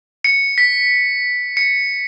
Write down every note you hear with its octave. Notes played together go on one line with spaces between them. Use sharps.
C#7
B6
C#7